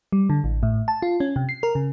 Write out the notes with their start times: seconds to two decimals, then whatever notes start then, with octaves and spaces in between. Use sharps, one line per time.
0.12 G3
0.30 D3
0.44 A1
0.63 A2
0.88 A5
1.02 F4
1.20 C#4
1.36 C3
1.49 C7
1.63 A#4
1.75 C#3